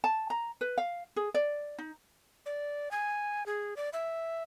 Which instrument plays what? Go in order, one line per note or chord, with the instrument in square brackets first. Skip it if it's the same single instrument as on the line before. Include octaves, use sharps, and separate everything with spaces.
[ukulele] A5
A#5
B4
F5
G#4
D5
D#4
[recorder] D5
G#5
G#4
D5
E5